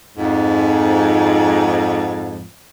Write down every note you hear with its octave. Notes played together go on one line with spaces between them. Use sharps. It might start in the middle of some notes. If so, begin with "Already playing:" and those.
F2 G#2